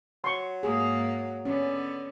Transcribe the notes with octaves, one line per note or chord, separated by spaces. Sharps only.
F#3 C6 C#6
G#2 A#3 G#4
D3 B3 C#4